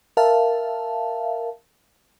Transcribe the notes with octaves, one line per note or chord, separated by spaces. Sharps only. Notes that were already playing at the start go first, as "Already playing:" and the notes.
A#4 E5 F5 A5